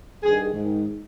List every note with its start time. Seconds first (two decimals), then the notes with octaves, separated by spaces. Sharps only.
0.22 G2 D#3 G#4
0.54 G#2 D#3